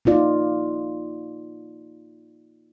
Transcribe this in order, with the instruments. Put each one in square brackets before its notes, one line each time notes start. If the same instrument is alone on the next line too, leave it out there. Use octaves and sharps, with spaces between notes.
[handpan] A#3 D#4 F4 D5